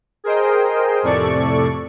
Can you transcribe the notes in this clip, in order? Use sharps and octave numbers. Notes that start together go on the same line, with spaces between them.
G#4 A#4 C5 D#5 G5
F2 A2 C3 A4 D5 C#6